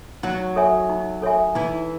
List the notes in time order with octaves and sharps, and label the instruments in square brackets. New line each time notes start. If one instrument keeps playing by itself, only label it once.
[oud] F#3 F#4 [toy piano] D#4
[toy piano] A4 C#5 E5 G#5
D#4
A4 C#5 E5 G#5
[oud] E3 E4 [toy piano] D#4